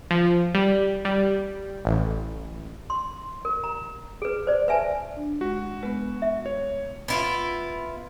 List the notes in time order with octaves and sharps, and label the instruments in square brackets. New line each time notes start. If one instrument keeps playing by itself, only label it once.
[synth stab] F3
G3
G3
A1
[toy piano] C6
A#4
A#5
G#4 B4
C5 D5
B4 E5 G#5 A5
[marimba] D4
[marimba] G#3 [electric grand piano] F#4
[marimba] G#3 B3 [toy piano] B4
[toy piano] E5
[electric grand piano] C#5
[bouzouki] B3 E4 F4